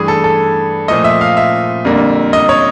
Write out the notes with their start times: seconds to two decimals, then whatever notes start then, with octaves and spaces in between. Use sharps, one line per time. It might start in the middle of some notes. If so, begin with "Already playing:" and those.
Already playing: G2 E3 A3 G#4
0.08 A4
0.24 A4
0.88 A#2 F3 A3 D#5
1.04 E5
1.21 F5
1.37 E5
1.85 F2 D3 G3 A#3
2.33 D#5
2.49 C#5